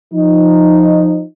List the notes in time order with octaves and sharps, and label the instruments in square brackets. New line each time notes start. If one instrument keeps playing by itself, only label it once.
[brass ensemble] F3 D#4